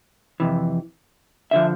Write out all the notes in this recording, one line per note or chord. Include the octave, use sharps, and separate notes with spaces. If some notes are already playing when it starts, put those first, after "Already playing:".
F2 C3 E3
D3 F3 E5